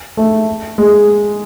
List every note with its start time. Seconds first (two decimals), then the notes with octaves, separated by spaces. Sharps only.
0.17 A3
0.78 G#3